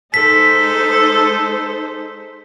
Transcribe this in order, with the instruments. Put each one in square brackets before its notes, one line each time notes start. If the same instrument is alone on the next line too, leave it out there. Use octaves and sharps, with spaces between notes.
[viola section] G#3 D#4 C5 [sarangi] A4 [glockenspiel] B6